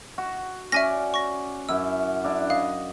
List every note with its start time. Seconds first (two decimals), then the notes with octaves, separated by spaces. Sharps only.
0.18 F#4
0.72 C#4 D5 E5 G#5 A#6
1.14 C#6 A#6
1.69 F#2 E4 E6
2.24 D4 E4
2.50 D#5 F5